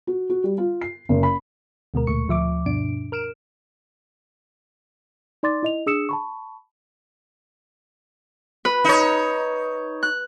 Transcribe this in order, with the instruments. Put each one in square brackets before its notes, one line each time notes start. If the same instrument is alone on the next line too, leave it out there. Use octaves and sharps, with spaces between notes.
[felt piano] F#4
F#4
G3
F4
C7
F#1
B5
[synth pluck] D2 B2 G#3 A#4
D2 A#2 A3 C#6 C#7
D2 F3 E5 D6
G2 B2 D4 D7
A#4 F6 D7 E7
[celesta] D#4 D5 C6 D6 A6
E4 D#5 F7
D4 G#4 D#6 E6 C#7 E7
A5 B5 C#6
[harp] B4
[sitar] D#4 C#5
[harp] F#6